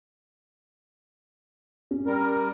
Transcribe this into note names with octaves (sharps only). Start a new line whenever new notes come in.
C#4
G3 A#4